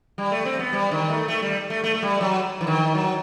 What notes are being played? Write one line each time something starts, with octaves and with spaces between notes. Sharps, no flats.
G3
A3
C4
B3
G3
D#3
A3
A3
G3
A3
A3
A3
G3
F#3
E3
D#3
F#3